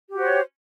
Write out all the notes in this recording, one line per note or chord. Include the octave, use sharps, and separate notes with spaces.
F#4 G4 C5 C#5